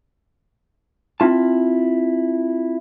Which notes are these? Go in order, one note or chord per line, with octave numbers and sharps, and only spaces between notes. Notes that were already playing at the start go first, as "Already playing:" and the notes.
C4 E4 F4 A5